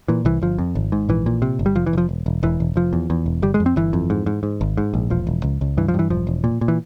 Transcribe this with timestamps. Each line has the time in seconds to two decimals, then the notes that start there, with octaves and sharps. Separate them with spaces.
0.08 A#2 E3
0.25 C2 E3
0.42 G1 F3
0.59 F2
0.75 G#1
0.92 G#2
1.09 A#1 E3
1.26 A#2
1.42 C3
1.59 G1
1.66 G3
1.75 F1 F3
1.86 E3
1.93 F1 F3
2.09 E1
2.26 E1
2.43 E1 E3
2.60 E1
2.76 F1 F3
2.93 E2
3.10 E2
3.26 E1
3.42 G1 G3
3.54 G#3
3.60 F2
3.66 C4
3.76 G1 E3
3.93 F2
4.10 G#2
4.26 G#2
4.43 G#2
4.61 G#1
4.77 G#2
4.94 A#1
5.10 E1 F3
5.27 E1
5.44 C#2
5.61 C#2
5.77 G2 E3
5.88 F3
5.94 G2 E3
6.10 E1 F3
6.27 E1
6.44 A#2
6.61 A#2
6.68 E3